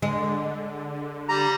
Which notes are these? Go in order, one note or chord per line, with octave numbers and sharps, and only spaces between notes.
D3 G#3
G3 A#5